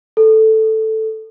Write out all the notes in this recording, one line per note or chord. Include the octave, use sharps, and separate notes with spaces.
A4